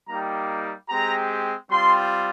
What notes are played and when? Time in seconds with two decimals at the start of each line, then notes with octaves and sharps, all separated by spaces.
0.08 G3 A#3 D#4 G4 A#5
0.89 G#3 C4 G4 A#5
1.70 G3 C4 F4 C6